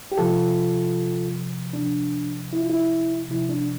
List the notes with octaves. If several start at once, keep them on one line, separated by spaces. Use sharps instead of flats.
G4
C3 F3 F4 A4
C3 D4
F3
E4
F4
E4
C3 F3 E4
D4